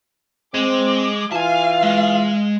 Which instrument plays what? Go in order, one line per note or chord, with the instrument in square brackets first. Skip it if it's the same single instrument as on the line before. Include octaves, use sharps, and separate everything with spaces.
[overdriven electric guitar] G#3 [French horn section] C4 [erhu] D6
[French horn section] E3 F4 [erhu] F5 [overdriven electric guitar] G#5 A5
[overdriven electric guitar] G#3